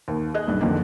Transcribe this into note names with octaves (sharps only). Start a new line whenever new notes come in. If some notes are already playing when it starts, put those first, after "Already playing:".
D#2
G#4 D#5 F#6
B1 G2
F2 D3 D#3 A#3